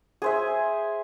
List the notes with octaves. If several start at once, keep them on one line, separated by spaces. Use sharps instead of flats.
G#4 C5 E5